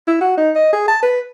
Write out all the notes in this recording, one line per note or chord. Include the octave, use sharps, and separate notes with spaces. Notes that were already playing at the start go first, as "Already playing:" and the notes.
E4
F#4
D#4
D#5
G#4
A5
B4